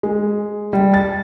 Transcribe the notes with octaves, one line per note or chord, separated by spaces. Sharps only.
G#3
G3
A6